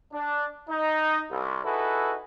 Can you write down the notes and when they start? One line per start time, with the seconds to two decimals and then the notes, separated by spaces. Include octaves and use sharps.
0.14 D4
0.70 D#4
1.31 C2
1.65 D#4 E4 F#4 G#4 A4 B4